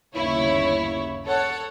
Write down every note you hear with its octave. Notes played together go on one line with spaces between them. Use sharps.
G1 D#2 C#3 E4 C#5
A4 C#5 F#5